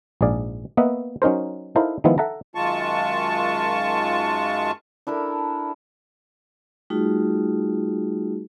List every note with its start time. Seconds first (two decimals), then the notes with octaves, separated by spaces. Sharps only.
0.21 A#1 G#2 G#4 D5 F5
0.77 A#3 B3 B4 D#5 E5
1.22 F#3 C#4 D#4 A#4 C5
1.76 D#4 E4 A4 A#4 C5 F5
2.04 D#3 F3 G#3 B3 E4 F4
2.18 A4 E5 F#5 A5 A#5
2.55 F#2 D#3 G#3 F4 A5 C#6
5.07 D4 E4 A4 A#4
6.90 G3 A3 D#4 F4 F#4 G#4